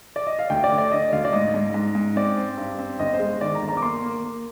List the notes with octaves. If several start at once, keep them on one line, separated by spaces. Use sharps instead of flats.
D5
D#5
F5
D2 G5
D5
D3
D5
D3 D#5
D2 F5
D5
G#2 D#5
G#2
G#2
G#2
C4 D5
C4
G2
C4
G1 D#5
C5
G#3
D#3 D5
A#5
G1
A#5
D6
A#3 C6
A#3
A#3